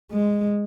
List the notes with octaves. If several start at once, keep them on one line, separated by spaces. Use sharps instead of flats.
G#3